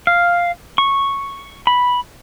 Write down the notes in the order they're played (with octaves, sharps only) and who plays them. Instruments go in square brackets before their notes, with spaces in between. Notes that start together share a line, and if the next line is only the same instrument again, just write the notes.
[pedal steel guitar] F5
C#6
B5